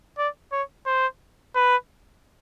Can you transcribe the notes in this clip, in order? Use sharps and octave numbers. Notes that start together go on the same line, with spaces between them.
D5
C#5
C5
B4